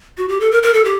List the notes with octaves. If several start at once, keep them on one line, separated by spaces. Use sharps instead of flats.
F#4
G4
A4
A#4
A#4
A4
G4